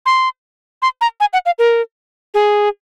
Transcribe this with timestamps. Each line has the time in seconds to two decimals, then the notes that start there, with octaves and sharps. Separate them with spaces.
0.06 C6
0.82 C6
1.01 A#5
1.20 G#5
1.33 F#5
1.46 F5
1.59 A#4
2.34 G#4